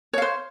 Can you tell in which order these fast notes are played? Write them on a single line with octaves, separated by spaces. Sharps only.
C#5 F5 C5